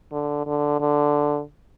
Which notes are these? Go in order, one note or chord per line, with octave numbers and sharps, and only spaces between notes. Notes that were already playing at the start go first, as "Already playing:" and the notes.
D3
D3
D3